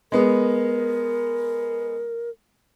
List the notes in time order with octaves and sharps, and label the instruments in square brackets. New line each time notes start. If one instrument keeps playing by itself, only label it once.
[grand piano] G#3 B3 [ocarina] A#4